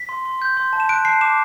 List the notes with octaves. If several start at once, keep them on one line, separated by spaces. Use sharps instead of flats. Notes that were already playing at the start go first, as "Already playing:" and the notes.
Already playing: B6
C6
C6
G6
C6
A5
E7
F#6 D7
A5 C7
D6 E7